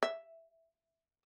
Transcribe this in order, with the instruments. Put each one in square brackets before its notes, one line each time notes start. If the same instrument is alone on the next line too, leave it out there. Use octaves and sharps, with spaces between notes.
[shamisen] E5